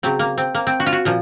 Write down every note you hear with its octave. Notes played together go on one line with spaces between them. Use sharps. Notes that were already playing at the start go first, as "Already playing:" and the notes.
C#3 F#3 C4
A#3
C4
A#3
C4
F#4
F4
F#4
A#2 F3